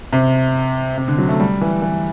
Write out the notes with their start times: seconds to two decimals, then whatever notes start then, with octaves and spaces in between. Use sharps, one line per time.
0.13 C3
0.97 C3
1.08 D3
1.18 F#3
1.29 A3
1.40 G3
1.61 E3
1.82 E3